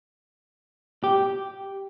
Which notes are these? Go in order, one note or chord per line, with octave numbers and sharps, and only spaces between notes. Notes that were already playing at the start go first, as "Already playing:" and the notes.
G4